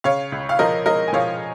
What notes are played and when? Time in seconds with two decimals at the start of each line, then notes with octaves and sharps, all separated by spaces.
0.04 C#3 C#5 F5
0.32 C#2
0.49 F5
0.59 F3 A#4 D#5
0.86 G#3 A#4 D#5
1.08 G#5
1.13 F3 C#5 F5